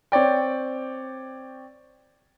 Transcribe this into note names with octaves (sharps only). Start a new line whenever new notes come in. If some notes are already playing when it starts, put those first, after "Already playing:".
C4 C#5 D5 G5